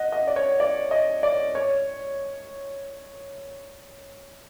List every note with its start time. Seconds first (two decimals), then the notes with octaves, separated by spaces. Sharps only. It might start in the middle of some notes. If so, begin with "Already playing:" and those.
Already playing: D#5 F#5
0.12 D#5
0.27 D5
0.36 C#5
0.60 D5
0.91 D#5
1.23 D5
1.55 C#5